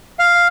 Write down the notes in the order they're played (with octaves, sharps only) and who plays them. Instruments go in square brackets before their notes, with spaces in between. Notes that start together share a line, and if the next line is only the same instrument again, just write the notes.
[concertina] F5